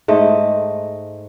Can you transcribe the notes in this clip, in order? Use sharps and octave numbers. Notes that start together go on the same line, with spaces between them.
G#2 A3 D#5